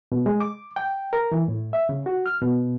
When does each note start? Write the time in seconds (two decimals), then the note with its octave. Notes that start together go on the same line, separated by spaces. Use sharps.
0.12 B2
0.26 G#3
0.40 D6
0.76 G5
1.13 A#4
1.32 E3
1.48 A2
1.73 E5
1.89 C#3
2.06 F#4
2.26 F6
2.42 B2